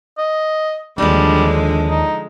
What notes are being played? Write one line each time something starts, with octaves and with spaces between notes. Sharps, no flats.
D#5
D#2 D3 F3 G3 G#3 D4
D#4